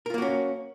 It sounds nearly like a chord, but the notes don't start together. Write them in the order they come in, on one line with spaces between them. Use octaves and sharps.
A#4 F4 A#3 F#4 C#4